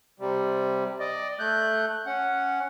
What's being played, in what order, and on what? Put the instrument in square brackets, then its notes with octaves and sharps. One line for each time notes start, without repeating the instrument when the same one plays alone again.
[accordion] C3 G3
D5 D#5
A3 F#6 G6
C#4 F#5